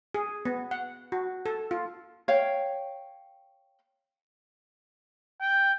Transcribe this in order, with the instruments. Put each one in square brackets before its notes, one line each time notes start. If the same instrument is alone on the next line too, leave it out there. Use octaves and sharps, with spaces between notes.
[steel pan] G#4
B3
F#5
F#4
A4
F4
[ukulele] C#5 F5 G5
[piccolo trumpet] G5